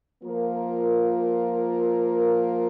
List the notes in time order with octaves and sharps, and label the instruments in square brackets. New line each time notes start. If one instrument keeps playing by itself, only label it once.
[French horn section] F3 A#3 F4 A#4